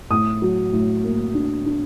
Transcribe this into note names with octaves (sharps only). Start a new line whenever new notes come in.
A2 D#6
F#3
A2
A#3
D4
D4